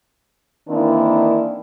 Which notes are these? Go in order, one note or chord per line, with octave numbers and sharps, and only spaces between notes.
D#3 E3 A#3 C4 D4 E4